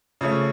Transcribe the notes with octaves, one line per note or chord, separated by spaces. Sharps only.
C#3 F3 A3 C#4